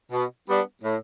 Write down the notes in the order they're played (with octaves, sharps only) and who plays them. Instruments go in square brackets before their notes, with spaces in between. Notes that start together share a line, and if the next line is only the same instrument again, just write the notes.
[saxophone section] B2
G3 B3 D4
A2